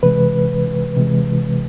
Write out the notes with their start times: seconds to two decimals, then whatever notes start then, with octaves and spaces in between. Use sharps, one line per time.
0.03 C3 E3 G#3 B4
0.96 C3 E3 G#3